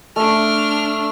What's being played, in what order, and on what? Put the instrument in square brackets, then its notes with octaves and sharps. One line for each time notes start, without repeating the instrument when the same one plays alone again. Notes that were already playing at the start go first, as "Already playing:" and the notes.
[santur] A3 [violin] D4 F6